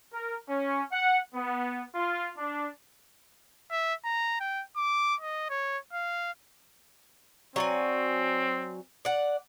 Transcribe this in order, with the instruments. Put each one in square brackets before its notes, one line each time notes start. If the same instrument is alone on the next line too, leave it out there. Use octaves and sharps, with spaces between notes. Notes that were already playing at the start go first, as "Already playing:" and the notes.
[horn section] A#4
C#4
F#5
B3
F4
D4
[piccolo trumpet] E5
A#5
G5
D6
D#5
C#5
F5
[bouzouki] F#3 D5 G#5 [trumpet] C4
[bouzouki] D5 F#5